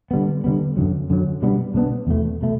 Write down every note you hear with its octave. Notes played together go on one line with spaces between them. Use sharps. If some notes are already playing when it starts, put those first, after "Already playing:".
D3 G3 B3
D3 G3 B3
F#2 D3 F#3
F#2 D3 F#3
B2 G3 B3 D4
B2 G3 B3 D4
E2 B2 A3
B2 A3